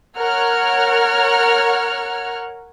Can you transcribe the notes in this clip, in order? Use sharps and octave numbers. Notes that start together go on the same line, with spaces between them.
A#4 C#5 F#5 F6